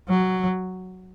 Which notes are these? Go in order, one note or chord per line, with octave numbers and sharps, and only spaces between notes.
F#3